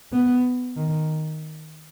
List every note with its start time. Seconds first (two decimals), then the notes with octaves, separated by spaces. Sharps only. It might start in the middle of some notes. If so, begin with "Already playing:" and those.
0.12 B3
0.77 D#3